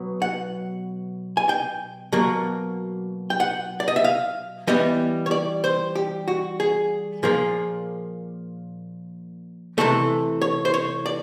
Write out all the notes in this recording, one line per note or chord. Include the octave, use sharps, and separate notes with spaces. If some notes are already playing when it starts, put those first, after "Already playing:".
Already playing: B2 F#3 B3
F#5
G#5
G5
B2 F#3 A#3
G5
F#5
D5
D#5
E5
F5
E3 G3 B3 D#5
C#5
D5
C5
G4
F#4
G#4
A#2 F3 A#3 G#4
C3 E3 A3 A4
C#5
C5
C#5
D5